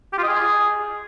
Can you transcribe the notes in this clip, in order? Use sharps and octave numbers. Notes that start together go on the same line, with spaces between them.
G4
F4
D#5
G#4